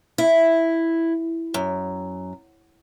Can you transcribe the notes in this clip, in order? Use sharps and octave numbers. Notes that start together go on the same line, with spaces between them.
E4
F#2